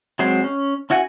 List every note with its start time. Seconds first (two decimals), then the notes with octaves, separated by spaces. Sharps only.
0.19 F#3 G#3 C4 C5
0.44 C#4
0.90 C#4 E4 F#4 F#5 G#5